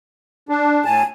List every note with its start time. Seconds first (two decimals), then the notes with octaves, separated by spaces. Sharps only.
0.49 D4
0.85 A2 G#5 A5